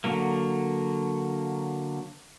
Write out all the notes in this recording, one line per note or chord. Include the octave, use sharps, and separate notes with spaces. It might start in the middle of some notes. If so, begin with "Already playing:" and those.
D3 F#3 A#3